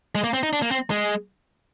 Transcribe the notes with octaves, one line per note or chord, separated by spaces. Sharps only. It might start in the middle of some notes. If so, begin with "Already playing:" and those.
G#3
A#3
C4
D#4
D4
A#3
C4
G#3